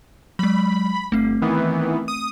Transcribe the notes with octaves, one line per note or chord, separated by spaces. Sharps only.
F#3 G#3 B5
G1 A3 C4 C7
D#3 E3 B3
D#6